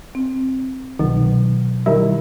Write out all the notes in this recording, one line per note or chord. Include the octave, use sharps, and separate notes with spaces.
C4
C2 B2 D#3 F#3
D#3 G3 E4 A#4